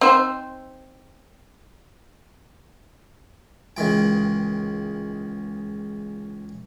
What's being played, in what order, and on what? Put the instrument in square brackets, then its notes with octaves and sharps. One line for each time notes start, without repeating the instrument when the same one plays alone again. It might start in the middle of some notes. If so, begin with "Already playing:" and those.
[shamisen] C4 D#4 C5
[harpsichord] C#2 D#3 E3 G5